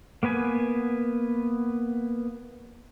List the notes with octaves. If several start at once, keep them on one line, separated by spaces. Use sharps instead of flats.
A#3 B3 B4 G#5